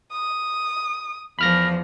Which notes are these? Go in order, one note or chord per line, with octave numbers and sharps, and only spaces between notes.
D#6
E2 F3 B5 F6 A#6